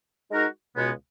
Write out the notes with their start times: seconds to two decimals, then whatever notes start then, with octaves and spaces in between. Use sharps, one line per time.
0.30 G#3 D#4 F#4 A#4
0.75 C#2 B2 G#3 B3